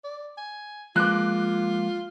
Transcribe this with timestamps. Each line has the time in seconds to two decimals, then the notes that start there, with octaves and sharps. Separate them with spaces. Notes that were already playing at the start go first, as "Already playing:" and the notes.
0.04 D5
0.38 G#5
0.96 F3 G#3 A#3 F4 D6 F#6